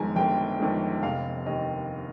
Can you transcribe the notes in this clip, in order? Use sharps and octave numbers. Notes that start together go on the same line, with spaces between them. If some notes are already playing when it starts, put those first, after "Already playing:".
Already playing: G1 F2 D#3 G#3 G#5 A#5
G1 G5
F2 D#3 G#3
F1 F5
D#2 D#3 D#5